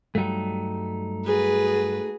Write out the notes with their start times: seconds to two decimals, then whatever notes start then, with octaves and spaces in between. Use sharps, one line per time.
0.15 G2 F#3 G3 A3 D#4
1.26 F#4 G#4 B4